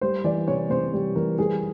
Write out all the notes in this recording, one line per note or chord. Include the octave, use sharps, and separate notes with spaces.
G3 C5
E3 D5
C3 C#5
C3 C5
G3
E3 A#4
G3 G#4